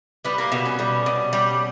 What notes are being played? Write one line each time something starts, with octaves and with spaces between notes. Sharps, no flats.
G3 B3
A#3
B2 B3
C#4
G3
B2
G3